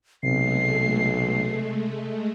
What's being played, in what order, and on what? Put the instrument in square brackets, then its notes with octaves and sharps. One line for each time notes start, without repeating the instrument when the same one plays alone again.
[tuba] B1 [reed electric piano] C3 [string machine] G#3 A3 [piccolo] C7